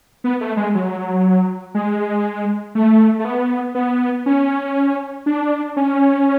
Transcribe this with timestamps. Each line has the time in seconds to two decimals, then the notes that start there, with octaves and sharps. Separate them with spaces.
0.24 B3
0.41 A3
0.57 G#3
0.75 F#3
1.74 G#3
2.75 A3
3.19 A3
3.25 B3
3.75 B3
4.26 C#4
5.26 D4
5.77 C#4